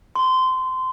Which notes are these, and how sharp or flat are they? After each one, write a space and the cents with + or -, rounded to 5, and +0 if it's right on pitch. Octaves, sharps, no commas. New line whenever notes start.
C6 -20